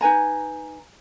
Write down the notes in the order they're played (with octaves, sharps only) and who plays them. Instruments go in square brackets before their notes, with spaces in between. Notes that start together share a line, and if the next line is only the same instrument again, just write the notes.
[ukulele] D#4 B4 G#5 A#5